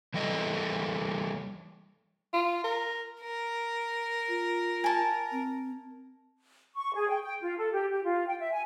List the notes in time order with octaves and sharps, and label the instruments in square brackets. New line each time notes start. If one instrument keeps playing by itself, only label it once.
[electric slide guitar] E3 G3 A4 D#5
[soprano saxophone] F4
A#4
[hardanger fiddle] A#4
[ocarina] F4
[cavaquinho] G#5 A5
[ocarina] C4
[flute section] C#6
G#4
G5
G5
F4
A4
G4
G4
F4
G5
E5
G#5